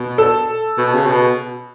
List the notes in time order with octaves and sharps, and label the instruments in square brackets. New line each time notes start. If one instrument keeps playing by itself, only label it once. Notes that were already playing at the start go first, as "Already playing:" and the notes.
Already playing: [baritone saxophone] B2
[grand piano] A4
[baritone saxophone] B2
C#3
B2